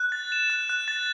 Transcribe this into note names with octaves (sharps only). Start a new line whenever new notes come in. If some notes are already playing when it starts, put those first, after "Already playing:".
Already playing: F#6
A6
E7
F#6
F#6
A6